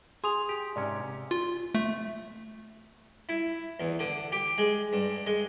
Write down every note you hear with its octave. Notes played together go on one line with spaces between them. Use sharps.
G#4 C6 D#6 F7
G4
G#2 C3 C#4 D5
F4
A3
E4
E2
D3
G4
G#3
G2
G#3